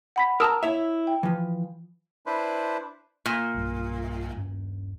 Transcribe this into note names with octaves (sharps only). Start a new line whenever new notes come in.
F#5 B5 B6
A#4 A5 A#5 D#6 E6
E4 C#5 E5
G5
E3 F3
D4 E4 B4 C5
A#2
B1 G2
D#1 G2 C#4